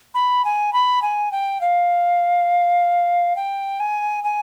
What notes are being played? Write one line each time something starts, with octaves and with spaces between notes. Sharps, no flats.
B5
G#5
B5
G#5
G5
F5
G5
G#5
G#5